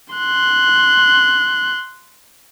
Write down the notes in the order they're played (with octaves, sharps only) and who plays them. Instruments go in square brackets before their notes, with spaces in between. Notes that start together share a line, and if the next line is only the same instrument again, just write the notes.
[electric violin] C6 F#6